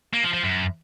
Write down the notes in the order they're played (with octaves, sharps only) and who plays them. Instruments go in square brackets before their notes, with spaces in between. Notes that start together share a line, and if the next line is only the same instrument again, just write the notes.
[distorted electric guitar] A#3
F3
F3
F#2